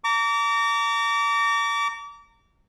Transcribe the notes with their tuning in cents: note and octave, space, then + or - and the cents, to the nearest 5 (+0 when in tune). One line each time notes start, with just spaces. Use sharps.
A#5 -30 D6 -35